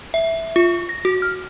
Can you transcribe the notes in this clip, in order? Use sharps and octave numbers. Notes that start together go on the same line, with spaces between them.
E5
F4
A#6
F#4
F6